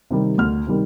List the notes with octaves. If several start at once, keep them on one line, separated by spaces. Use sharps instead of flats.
C3 D#3 G3
D2 F6
C3 D#3 G3